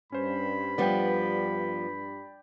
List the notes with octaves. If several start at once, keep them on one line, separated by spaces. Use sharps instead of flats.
G2 C#4 C5 B5
F3 G3 B3 D5 G5